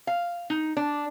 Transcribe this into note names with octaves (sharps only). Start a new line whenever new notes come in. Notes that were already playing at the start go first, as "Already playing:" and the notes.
F5
D#4
D4